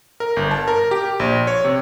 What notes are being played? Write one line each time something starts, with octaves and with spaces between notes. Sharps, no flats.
A#4
G1
A5
A#4
G4
A#1
C#5
C3